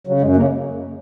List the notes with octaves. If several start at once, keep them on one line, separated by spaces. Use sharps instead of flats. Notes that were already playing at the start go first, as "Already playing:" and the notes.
C#3 F#3
F#2 G#3
C#3 A#3